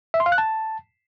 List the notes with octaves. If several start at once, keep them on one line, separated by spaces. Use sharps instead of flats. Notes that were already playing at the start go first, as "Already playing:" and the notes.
E5
C6
F5
F#6
A5